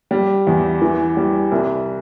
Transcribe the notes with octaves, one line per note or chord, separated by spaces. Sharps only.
G3
E2
E3
G3
C2